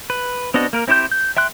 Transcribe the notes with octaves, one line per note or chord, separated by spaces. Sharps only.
B4
B3 C4 D4 F#4 D#5
A#3 A#4
C4 E4 G4 C5 G6
G6
E5 G5 C6 F#6